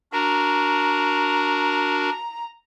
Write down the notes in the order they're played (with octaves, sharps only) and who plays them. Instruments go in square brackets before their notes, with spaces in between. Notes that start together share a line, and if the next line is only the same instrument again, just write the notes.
[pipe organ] D4 F#4 A#4 [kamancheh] A#5